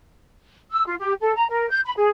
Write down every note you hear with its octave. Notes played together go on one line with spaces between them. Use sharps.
E6
F4
G4
A4
A#5
A#4
G6
B5
G#4